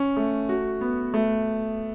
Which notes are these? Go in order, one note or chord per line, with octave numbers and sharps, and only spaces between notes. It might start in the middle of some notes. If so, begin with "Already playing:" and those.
Already playing: C#4
A3
F#4
B3
A3